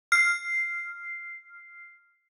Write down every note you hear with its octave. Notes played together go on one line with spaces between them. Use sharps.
F6 C7